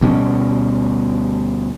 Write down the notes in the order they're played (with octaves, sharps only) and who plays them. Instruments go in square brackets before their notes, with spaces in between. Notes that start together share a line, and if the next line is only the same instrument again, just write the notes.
[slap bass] D2 B2 G3 C#4